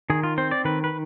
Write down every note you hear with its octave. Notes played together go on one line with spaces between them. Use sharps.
D#3 G#4
F4
C4 C5
D5
D#3 B4
B4